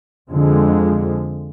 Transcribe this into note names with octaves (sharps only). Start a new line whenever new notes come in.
F2 D3 F3 G#3